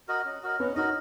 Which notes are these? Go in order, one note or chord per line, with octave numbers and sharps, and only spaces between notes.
F#4 A#4 D#5
C#4
F#4 A#4 D#5
B3 C#4
D#4 F#4 A#4 D#5